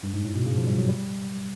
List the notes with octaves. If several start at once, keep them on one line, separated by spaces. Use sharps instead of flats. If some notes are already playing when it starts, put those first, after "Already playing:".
G2
G#2
A2
B2
C#3
F3
G3
F#3
G3